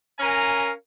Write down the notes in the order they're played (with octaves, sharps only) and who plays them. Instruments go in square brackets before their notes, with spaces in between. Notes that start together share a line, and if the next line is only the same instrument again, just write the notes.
[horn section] C#4 A#4 F5 G#5 A#5